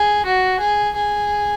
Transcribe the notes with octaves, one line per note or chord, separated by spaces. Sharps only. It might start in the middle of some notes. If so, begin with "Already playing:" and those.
Already playing: G#4
F#4
G#4
G#4